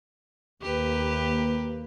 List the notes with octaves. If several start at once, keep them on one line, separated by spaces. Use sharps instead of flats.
D#2 A#3 G4 B4